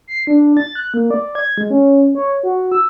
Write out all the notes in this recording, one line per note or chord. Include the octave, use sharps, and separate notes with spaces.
C7
D4
A6
F#6
A#3
D5
G#6
G#3
C#4
C#5
F#4
E6